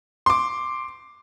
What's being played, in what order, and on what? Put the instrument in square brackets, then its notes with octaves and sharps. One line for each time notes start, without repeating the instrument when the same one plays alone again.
[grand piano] C6 D6